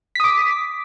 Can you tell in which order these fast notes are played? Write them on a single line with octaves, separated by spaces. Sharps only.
B6 D#6 D6